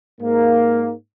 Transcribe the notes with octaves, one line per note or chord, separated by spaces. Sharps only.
G#2 A#3